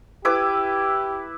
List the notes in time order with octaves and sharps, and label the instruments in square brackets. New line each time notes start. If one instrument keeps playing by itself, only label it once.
[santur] E4 B4 D6 [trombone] G4